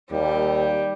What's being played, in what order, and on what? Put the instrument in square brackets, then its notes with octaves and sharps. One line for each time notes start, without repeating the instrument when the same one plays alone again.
[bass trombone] D#2 [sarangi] G3